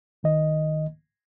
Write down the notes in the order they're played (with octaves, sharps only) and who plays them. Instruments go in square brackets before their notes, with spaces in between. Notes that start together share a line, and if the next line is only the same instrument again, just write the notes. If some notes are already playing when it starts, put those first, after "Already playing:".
[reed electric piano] C2 D#3 D#5